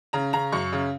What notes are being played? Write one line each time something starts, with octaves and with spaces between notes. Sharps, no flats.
C#3 A#5
C#3 A#5
F#2 C#6
C#3